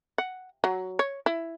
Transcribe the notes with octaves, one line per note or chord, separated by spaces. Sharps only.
F#5
F#3
C#5
E4